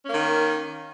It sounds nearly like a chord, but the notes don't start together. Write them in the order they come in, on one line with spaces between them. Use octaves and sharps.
C#4 A#3 D#3